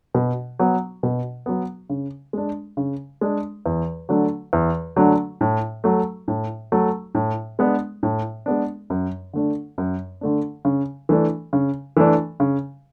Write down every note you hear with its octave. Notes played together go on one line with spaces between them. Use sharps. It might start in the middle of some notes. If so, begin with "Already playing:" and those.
B2
F#3 B3
B2
F#3 B3
C#3
G#3 D4
C#3
G#3 D4
E2
D3 F#3 A3 D4
E2
D3 F#3 A3 D4
A2
F#3 A3
A2
F#3 A3
A2
G#3 B3 D4
A2
G#3 B3 D4
F#2
D3 A3 D4
F#2
D3 A3 D4
C#3
E3 A3 D4
C#3
E3 A3 D4
C#3